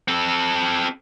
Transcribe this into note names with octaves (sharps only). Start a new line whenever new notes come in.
C4 A4